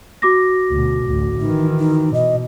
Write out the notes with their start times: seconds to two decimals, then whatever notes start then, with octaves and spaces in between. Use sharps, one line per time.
0.22 F#4 D6 A#6
0.70 D2 B2
1.06 A1 D2
1.41 D#3 E3 D#4
1.79 D#4
2.14 B2 D#5